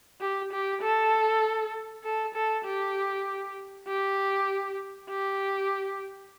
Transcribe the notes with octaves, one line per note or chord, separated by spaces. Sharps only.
G4
G4
A4
A4
A4
G4
G4
G4